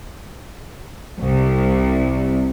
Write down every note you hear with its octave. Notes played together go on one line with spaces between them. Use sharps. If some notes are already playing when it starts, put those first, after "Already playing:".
C2